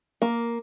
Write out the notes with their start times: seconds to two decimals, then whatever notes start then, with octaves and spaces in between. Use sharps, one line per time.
0.22 A#3